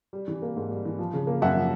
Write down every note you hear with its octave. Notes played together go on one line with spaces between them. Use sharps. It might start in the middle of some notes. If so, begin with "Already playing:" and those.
G3
E3
A#3
G#2
G3
E3
F3
C#3
A#3
F#2 E5 F#5
F3